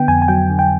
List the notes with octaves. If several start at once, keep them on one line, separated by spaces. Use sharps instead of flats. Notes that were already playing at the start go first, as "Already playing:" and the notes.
Already playing: D3 B3 G5
F2 G#5
G#5
F#3 G5
D3
G5